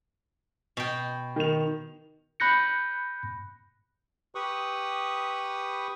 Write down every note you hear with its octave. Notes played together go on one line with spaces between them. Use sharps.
B2 G5
D#3 F7
B5 F#6 G6 A#6 C#7
G4 B4 B5 C#6 D#6